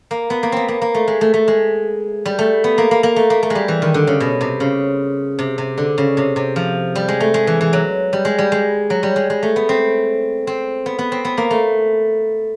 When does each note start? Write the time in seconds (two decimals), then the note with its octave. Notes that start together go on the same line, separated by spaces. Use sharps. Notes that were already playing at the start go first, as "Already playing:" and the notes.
0.11 A#3
0.30 B3
0.43 A#3
0.52 B3 C4
0.68 A#3
0.82 A#3
0.94 A3
1.08 G#3
1.21 A3
1.34 A3
1.48 G#3
2.26 G3
2.39 A3
2.64 B3
2.78 A#3
2.91 A#3
3.03 A#3
3.16 A3
3.30 A#3
3.43 A3
3.50 G#3
3.55 G3
3.68 E3
3.82 D#3
3.94 D3
4.07 C#3
4.20 B2
4.41 C3
4.60 C#3
5.39 C3
5.58 C3
5.78 D3
5.98 C#3
6.17 C3
6.36 C3
6.56 F3
6.95 G3
7.08 G#3
7.20 A3
7.34 G#3
7.47 E3
7.61 E3
7.73 F#3
8.13 G3
8.25 G#3
8.39 G3
8.52 G#3
8.90 F#3
9.03 G3
9.16 G#3
9.30 G#3
9.43 A3
9.56 B3
9.69 C4
10.47 C4
10.86 B3
10.99 B3
11.12 C4
11.25 B3
11.38 A#3
11.51 A3